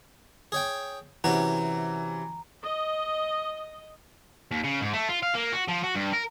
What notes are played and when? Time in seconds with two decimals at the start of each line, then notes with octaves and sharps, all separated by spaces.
0.52 G#4 C#5 G5
1.24 C3 E3 C#4 F#4 A#5
2.64 D#5
4.52 D#2
4.64 C#3
4.81 G#2
4.93 A3
5.09 F4
5.23 F5
5.35 A#3
5.53 F#4
5.68 F3
5.84 F#4
5.95 G2
6.13 A#4